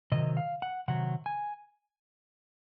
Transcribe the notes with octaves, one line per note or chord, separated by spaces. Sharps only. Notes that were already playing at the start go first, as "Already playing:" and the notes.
C3 D#3 F#3 D#5
F5
F#5
C3 D#3 F#3 F#5
G#5